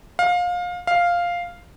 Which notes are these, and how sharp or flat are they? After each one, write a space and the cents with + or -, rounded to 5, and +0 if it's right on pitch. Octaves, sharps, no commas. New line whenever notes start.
F5 +25
F5 +0